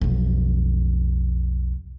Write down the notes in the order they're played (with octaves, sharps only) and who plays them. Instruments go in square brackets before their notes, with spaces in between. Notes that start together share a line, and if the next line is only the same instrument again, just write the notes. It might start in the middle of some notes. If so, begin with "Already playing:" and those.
[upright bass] B1 F2